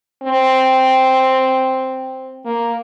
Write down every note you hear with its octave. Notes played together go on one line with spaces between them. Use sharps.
C4
A#3